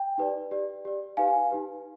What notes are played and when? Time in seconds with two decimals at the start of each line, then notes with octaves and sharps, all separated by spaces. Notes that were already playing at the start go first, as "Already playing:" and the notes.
Already playing: G5
0.18 D#4 G4 B4 D5
0.51 G4 D5
0.85 G4 D5
1.17 D#4 G4 B4 F5 G#5
1.51 D#4 G4 B4